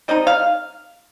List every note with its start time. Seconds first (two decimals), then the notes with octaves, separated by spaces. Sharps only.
0.08 G3 C4 D#4 D#5
0.27 F5